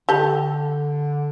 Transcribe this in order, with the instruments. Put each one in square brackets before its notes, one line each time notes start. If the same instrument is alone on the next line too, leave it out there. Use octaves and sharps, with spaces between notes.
[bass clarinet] D3 [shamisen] G4 A4